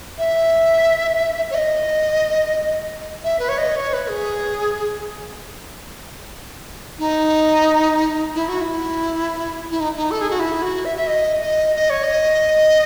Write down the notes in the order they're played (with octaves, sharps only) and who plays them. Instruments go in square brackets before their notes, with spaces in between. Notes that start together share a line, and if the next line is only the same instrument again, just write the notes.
[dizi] E5
C#5
D#5
E5
B4
C#5
D#5
C#5
B4
G#4
D#4
E4
F#4
E4
E4
D#4
D#4
A4
G#4
F#4
E4
F#4
E5
E5
D#5
D#5
D#5
C#5
D#5